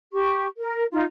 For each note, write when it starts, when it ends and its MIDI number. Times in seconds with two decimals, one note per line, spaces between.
0.13 0.47 67
0.13 0.47 85
0.59 0.85 70
0.93 1.04 63
0.93 1.04 65